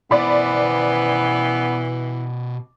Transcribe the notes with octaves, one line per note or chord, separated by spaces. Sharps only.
B2 E3 B3 C5 D5 B5